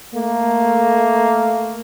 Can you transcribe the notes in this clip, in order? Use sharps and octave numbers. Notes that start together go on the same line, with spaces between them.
A3 A#3